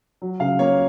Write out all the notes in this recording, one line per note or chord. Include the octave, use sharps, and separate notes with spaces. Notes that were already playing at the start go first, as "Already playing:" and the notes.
F#3
C#3 F5
A#3 C#5